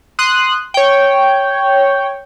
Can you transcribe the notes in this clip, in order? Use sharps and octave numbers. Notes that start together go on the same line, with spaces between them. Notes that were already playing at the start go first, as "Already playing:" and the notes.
C6 D#6 F#6
C#5 G5